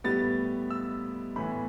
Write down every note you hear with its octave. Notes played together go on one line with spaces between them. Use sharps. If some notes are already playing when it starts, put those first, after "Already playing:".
A2 G3 B3 A6
E6
A2 E3 B3 B5